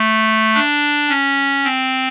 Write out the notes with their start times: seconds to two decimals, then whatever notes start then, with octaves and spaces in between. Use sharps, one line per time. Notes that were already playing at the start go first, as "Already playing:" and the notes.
Already playing: A3
0.54 D4
1.09 C#4
1.64 C4